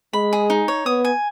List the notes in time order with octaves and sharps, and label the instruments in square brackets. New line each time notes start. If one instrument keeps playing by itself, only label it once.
[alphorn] G#3 [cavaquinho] B5
[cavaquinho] G#4
D#4
C#5
[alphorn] B3 [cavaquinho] D#6
[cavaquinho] G#5